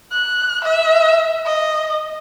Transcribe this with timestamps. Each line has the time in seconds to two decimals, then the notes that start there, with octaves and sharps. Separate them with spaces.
0.12 F#6
0.65 E5
1.46 D#5